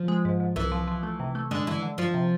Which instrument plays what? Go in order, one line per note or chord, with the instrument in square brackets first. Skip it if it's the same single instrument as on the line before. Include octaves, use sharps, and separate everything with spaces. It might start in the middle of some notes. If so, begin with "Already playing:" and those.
Already playing: [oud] F3
[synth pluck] G#3
G#2
G#2
[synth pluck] C2 [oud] E3
[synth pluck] F3
F3
A3
C3
A3
[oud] D3 [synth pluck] G#3
[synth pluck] D3 [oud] E3
[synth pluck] D3
[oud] F3 [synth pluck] F4
[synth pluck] C3